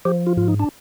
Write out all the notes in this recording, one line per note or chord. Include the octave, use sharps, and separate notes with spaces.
F3 G4
F4
G#2 F4
D#4
D4